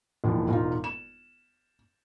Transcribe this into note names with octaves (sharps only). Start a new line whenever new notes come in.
E1 D#2 E3 F3
E1 D#4 F4
E7